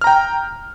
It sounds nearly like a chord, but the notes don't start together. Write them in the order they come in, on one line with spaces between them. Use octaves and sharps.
F6 A#5 G5